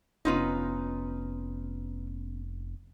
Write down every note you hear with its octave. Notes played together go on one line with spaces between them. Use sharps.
F1 B3 C#4 D#4 F4 B4